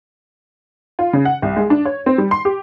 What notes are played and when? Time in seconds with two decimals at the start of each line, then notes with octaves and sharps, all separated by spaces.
0.99 F4
1.13 C#3
1.25 F#5
1.42 C2
1.56 G#3
1.70 D4
1.86 C#5
2.06 C4
2.18 G3
2.31 C6
2.45 G4